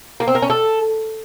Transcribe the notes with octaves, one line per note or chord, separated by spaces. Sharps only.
A#3
C4
A#4
C#4
A4